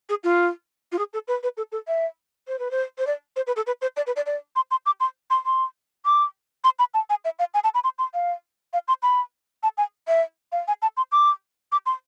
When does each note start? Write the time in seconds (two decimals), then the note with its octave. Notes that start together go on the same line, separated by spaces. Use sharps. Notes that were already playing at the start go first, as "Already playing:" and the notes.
0.09 G#4
0.24 F4
0.92 F4
0.98 G#4
1.13 A4
1.28 B4
1.43 B4
1.57 A4
1.72 A4
1.88 E5
2.48 C5
2.59 B4
2.71 C5
2.98 C5
3.07 D5
3.36 C5
3.47 B4
3.56 A4
3.67 B4
3.82 C5
3.97 D5
4.07 B4
4.16 D5
4.26 D5
4.56 C6
4.71 C6
4.86 D6
5.00 C6
5.30 C6
5.46 C6
6.05 D6
6.64 C6
6.79 B5
6.94 A5
7.10 G#5
7.25 E5
7.39 F5
7.54 G#5
7.64 A5
7.74 B5
7.84 C6
7.98 C6
8.14 F5
8.73 F5
8.88 C6
9.03 B5
9.63 A5
9.78 G#5
10.08 E5
10.52 F5
10.68 G#5
10.82 A5
10.97 C6
11.12 D6
11.72 D6
11.86 C6